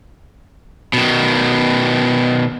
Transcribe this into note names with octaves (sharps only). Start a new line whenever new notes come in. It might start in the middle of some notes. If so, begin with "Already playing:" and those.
B2 D#3